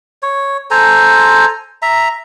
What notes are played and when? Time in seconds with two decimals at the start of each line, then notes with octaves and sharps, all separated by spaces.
0.23 C#5
0.71 A4 C5 G#5 A#5
1.82 E5 A#5